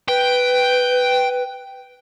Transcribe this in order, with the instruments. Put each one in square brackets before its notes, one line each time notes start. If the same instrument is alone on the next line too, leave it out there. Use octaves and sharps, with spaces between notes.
[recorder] B4 [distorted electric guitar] G5